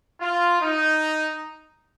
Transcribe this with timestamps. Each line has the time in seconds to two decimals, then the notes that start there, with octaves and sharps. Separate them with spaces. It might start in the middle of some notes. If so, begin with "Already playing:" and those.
0.20 F4
0.61 D#4